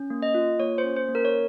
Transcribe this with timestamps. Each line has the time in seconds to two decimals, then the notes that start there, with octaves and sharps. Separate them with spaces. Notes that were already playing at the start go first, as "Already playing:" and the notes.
Already playing: C#4
0.10 A#3
0.22 D#5
0.34 F4
0.59 A#3 C#5
0.78 C5
0.84 C#4
0.96 C5
1.09 A#3
1.15 A#4
1.25 C#5